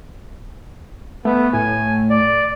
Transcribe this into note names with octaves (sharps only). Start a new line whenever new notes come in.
A3 B3
A2 G#5
D5